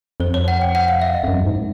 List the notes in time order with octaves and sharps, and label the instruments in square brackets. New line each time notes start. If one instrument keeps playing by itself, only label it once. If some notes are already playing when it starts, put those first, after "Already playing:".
[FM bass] F2 [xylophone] C5
[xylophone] C#5
F#5
G5
F#5
F5
E5
D#5
[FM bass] F2
F#2
G#2